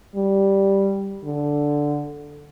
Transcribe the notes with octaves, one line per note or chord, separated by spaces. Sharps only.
G3
D3